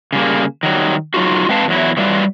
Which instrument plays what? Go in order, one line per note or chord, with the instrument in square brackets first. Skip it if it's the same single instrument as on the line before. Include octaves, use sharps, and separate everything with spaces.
[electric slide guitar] C#3 G3 A#3
D#3 F#3 G3
F#3 D#4 F4 F#4
G#3 C4 B4 F5 A5
E2 F#3 E4
E3 F#3 G3 E4 F4